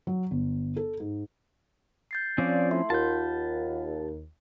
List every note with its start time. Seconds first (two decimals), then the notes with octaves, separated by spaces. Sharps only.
0.07 F#3
0.31 G1
0.76 A4
1.00 G#2
2.11 G6 A6 C7
2.38 F3 C4 C#4 F4 D5
2.71 A3 E4 C6
2.90 D#2 F4 F5 F#5 A5 G6